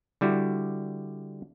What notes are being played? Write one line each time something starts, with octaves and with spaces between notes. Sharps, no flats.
D3 G3 E4 F#4